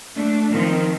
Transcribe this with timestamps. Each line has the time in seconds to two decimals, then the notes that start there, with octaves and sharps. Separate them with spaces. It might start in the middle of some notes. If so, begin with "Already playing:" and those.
0.17 A3 D4
0.51 D#3 F3 C4